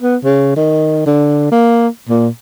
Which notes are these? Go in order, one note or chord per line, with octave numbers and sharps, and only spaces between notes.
B3
C#3
D#3
D3
A#3
A#2